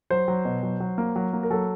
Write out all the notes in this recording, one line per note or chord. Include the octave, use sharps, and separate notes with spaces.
F#3 C5
F#3
B2
F#3
F#3
A#3
F#3
A#3
A#4
F#3 A4